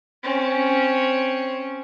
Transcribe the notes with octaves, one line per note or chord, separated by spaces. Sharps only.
C4 C#4